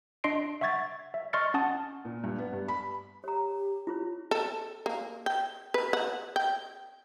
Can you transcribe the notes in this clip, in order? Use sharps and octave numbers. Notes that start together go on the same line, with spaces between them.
D4 D#5 C6 C7 D7
E5 F#5 C#6 G#6 A6
E5
D#5 C6 C#6 F6 A6 C#7
C#4 F#5 A5 D#6 A6
A#2
G2
B3
G2
B5
G4 C#5 A#5
E4 F4 C#5
A4
A#3
G5
B4
F#5
G5